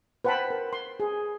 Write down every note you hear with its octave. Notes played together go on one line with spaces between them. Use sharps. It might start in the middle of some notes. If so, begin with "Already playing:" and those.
B4 C5 F#5 G5 A5 B5
A#4
C6
G#4